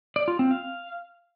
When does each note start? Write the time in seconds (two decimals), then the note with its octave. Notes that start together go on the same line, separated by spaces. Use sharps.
0.16 D5
0.28 F4
0.39 C4
0.51 F5